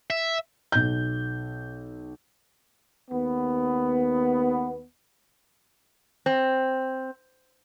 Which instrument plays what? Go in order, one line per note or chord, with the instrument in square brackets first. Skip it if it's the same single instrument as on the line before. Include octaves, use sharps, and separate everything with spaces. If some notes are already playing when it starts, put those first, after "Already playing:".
[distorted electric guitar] E5
[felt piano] B1 G6
[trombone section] D#2 B3
[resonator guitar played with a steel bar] C4